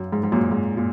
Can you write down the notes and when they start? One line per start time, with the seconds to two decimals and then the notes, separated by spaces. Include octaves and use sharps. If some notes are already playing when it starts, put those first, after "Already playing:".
Already playing: F#2
0.13 G#2
0.23 G#2
0.32 F#2 A#2
0.51 G#2
0.77 A#2